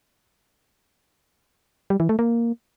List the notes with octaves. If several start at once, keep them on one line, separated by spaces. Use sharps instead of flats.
G3
E3
A3
A#3